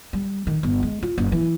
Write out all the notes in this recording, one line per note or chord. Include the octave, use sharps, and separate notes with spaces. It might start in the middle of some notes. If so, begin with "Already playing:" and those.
G3
D#3
G1
G#3
F4
F#1
E3